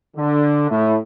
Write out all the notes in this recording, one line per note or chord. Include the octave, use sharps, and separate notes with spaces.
D3
A2